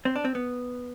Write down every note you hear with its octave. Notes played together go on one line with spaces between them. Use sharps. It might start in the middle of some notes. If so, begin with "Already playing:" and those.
C4
D4
C4
B3